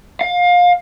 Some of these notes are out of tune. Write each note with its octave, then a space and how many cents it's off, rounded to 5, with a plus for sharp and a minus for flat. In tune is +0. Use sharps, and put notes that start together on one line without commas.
F5 +25